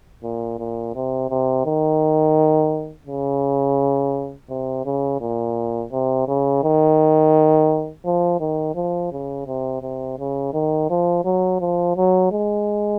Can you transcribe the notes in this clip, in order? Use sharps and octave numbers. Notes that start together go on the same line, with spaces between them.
A#2
A#2
C3
C3
D#3
C#3
C3
C#3
A#2
C3
C#3
D#3
F3
D#3
F3
C#3
C3
C3
C#3
D#3
F3
F#3
F3
F#3
G#3